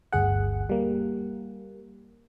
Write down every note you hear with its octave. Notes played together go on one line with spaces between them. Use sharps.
G1 D2 G#4 F#5
G3 A#3